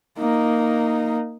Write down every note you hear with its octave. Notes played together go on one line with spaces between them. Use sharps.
A#3 D#4